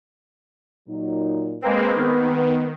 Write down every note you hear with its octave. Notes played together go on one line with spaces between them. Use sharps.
A#2 F#3 D#4
G#3 A#3 C4 B4
D#3 B3